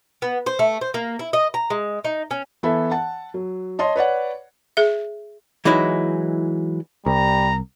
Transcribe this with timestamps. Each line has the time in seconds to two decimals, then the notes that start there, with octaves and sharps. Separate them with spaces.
0.22 B3
0.46 C5
0.59 A3
0.81 C5
0.94 A#3
1.19 E4
1.33 D#5
1.54 A#5
1.70 G#3
2.04 D#4
2.31 C#4
2.63 E3 B3 E4 A4 E5
2.91 F#5 A5
3.34 F#3
3.79 C#5 D#5 A5 C6
3.96 B4 C#5 D5 F#5
4.77 G#4 E5
5.65 E3 F#3 G#3 D#4 E4
7.06 C2 G3 A#5